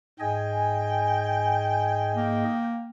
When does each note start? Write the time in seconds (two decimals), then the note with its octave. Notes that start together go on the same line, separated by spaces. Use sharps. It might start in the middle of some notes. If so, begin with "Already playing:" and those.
0.20 G#2 G#4 D#5 G5 G#5
2.15 A#3